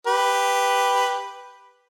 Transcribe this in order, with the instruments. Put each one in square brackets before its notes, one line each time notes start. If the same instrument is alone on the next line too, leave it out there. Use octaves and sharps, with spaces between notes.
[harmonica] G4 B4